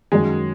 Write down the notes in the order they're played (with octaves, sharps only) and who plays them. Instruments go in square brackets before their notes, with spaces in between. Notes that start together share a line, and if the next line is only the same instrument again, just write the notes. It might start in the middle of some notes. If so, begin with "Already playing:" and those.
[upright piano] F#2 D#3 F#3 [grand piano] G#3